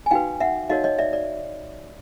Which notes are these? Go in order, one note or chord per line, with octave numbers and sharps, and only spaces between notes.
G#5
D#4 F#4 B4 F5 G5
E5 F#5
D#4 F#4 A#4 C#5 D#5 F5
C#5 D#5
D5 E5
D5